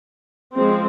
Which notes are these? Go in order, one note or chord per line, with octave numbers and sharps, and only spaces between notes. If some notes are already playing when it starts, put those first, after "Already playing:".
F3 G#3 C4